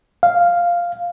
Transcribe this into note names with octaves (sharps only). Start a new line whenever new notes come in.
F5